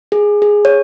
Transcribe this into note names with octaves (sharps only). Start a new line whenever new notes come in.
G#4
G#4
C#5